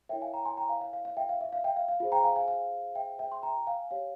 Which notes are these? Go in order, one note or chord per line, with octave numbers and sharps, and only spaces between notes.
E4 A#4 C#5 E5 G5
F5 G#5
G5 A#5
G#5 C6
G5 A#5
F5 G#5
F5
F5
F5
E5 G5
F5
E5
F5
E5 G5
F5
F5
F4 G#4 C5 F5
G5 A#5
F5 G#5
F5 G#5
F5
E5 G5
E5 G5
C6
G5 A#5
F5 G#5
G4 C#5 F5